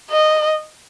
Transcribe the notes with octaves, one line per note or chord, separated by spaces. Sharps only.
D#5